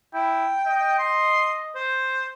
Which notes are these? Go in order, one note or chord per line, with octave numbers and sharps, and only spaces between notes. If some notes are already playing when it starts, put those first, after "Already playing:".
E4 G5
D#5
C6
C5